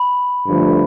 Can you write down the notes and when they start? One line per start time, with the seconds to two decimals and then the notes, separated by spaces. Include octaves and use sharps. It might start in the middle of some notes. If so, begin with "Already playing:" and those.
Already playing: B5
0.46 G2 D3 F3 A3